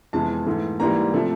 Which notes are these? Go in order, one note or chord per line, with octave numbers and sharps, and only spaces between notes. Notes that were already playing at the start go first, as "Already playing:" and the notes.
F2 C3 E3 G#3 B3 A5
G#2 E3 A3
G#2 E3 G3 A#3 A#5
C3 F3 A3